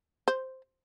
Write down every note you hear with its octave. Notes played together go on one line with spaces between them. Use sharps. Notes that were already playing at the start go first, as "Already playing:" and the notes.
C5